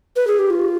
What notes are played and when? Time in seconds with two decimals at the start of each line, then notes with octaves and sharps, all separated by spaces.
0.16 B4
0.27 G#4
0.39 G4
0.50 F4